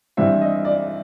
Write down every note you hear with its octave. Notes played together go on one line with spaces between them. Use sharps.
G2 E3 G3 C4 E5
D#5
D5